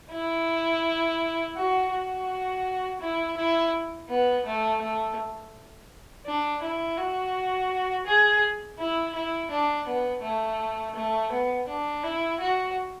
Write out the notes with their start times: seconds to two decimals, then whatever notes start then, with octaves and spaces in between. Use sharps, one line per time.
0.12 E4
1.57 F#4
1.92 F#4
3.01 E4
3.37 E4
4.09 B3
4.46 A3
4.82 A3
6.26 D4
6.62 E4
6.98 F#4
8.07 G#4
8.79 E4
9.15 E4
9.51 D4
9.87 B3
10.23 A3
10.96 A3
11.32 B3
11.68 D4
12.03 E4
12.40 F#4